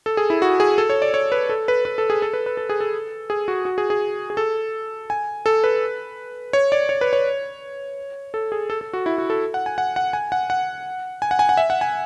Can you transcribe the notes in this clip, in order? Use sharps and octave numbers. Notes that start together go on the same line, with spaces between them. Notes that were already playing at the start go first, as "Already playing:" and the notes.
A4
G#4
E4
F#4
G#4
A4
C#5
D5
C#5
B4
A4
B4
B4
A4
G#4
A4
B4
B4
A4
G#4
A4
G#4
F#4
F#4
G#4
G#4
G#4
A4
G#5
A4
B4
C#5
D5
C#5
B4
C#5
A4
G#4
A4
A4
F#4
E4
F#4
A4
F#5
G#5
F#5
F#5
G#5
F#5
F#5
G#5
F#5
G#5
F#5
E5
F#5
G#5